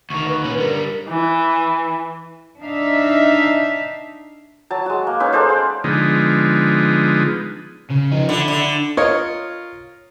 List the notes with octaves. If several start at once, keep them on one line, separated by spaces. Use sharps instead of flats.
D2 D#3 C#6
B4
A#2 C#4
D3 G3 A#4
A#4
E3
D4 D#4 E5 F5
F#3 A5
G#3 F#4
A#3
C#4 D#4 B4
G#3 A4 C5 D5
F5 G5
D3 F3 G#3 B3 D#4
C#3
F3 D#4
D3 E4
D3
F4 A#4 C#5 D#5